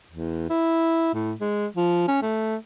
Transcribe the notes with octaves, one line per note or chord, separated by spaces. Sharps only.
E2
E4
A2
G#3
F3
C#4
A3